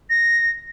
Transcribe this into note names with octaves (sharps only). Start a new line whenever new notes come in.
A#6